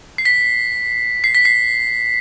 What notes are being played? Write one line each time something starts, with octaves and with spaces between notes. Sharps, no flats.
C7
B6
C7
B6
C7